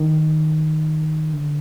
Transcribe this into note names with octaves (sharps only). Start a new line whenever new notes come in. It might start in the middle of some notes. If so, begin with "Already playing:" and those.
Already playing: D#3
D3